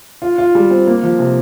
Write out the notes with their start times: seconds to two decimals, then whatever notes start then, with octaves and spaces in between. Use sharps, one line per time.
0.22 F4
0.38 F4
0.55 G3
0.71 C4
0.87 A#3
1.03 F3
1.19 C3